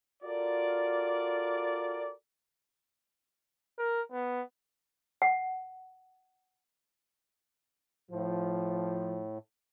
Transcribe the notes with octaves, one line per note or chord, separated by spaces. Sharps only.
F4 F#4 A4 A#4 D5
A#4
B3
F#5
A2 F3